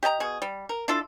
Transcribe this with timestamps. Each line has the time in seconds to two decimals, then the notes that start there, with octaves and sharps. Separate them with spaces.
0.03 G4 D#5 A5 A#5
0.20 B2 G#4
0.42 G3
0.69 A#4
0.88 D4 E4 F4 A4